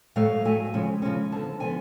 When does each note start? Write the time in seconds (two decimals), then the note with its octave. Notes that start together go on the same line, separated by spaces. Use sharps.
0.16 A2 F#3 A3 F5
0.45 A2 F#3 A3 G#5
0.74 C#3 F3 G#3 C#4
1.02 C#3 F3 G#3 C#4
1.32 D3 F3 B3 A5
1.60 D3 F3 B3 G#5